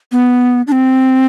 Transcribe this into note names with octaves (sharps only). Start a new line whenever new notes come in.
B3
D4
C4